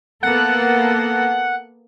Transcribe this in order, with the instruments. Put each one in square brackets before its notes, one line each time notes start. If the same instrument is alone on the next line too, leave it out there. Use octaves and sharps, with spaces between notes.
[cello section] A#3 B3 A4 [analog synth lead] F#5